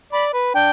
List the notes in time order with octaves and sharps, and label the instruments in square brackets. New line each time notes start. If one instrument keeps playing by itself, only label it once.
[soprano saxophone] D5 [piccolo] B5
[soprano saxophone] B4
[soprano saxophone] D4 [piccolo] G5